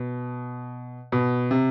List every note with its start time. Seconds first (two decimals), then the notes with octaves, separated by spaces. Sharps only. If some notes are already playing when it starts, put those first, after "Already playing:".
Already playing: B2
1.12 B2
1.51 C3